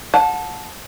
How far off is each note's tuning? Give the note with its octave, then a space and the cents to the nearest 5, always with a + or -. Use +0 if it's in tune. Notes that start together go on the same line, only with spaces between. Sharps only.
F#5 -35 A5 -10